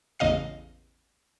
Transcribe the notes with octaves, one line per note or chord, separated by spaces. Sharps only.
A1 E2 C#3 D#5 F5 C7